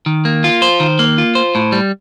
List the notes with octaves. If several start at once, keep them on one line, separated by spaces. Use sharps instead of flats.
D#3
A#3
F4
C5
D#3
A#3
F4
C5
A2
G3